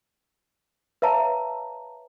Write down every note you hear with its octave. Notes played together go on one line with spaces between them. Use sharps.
B4 C#5 E5 F5 A5 A#5